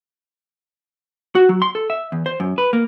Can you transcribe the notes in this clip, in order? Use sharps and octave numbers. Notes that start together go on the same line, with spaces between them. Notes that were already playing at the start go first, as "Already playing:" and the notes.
F#4
F#3
C6
A4
E5
E2
C5
F#2
B4
A#3